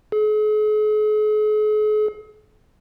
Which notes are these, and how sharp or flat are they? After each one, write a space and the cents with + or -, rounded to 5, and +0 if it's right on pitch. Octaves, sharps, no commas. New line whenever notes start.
G#4 +45